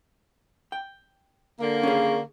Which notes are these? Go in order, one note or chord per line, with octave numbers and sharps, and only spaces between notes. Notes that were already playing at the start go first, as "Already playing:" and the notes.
G5
D3 A#3
C#4 D4 G#4